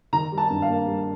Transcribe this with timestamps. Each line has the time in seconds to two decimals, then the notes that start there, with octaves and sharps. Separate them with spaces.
0.13 D#3 A#5
0.32 G3
0.38 A5
0.51 G2
0.62 F5
0.69 A#3
0.87 G3